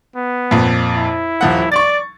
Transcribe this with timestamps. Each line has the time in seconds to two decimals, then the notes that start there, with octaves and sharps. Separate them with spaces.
0.16 B3
0.51 F2 A#2
0.96 E4
1.41 D#1 F3 F#5
1.72 D5 C#6 A6